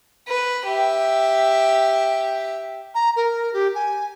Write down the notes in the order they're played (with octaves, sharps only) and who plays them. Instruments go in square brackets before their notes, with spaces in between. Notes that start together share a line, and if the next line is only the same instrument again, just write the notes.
[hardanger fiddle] B4
G4 E5
[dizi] A#5
A#4
G4
G#5